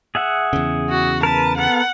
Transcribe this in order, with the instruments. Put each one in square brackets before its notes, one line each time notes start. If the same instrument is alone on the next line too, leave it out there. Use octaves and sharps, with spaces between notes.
[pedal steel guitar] G#4 E5 F#5
[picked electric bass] E2 C#3
[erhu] F#4
[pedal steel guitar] A#4 B4 [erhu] A5
[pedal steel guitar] B3 A4 A#4 [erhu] F#5